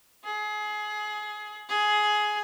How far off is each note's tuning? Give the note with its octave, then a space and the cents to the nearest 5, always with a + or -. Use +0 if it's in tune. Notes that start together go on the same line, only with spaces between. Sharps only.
G#4 +25
G#4 +15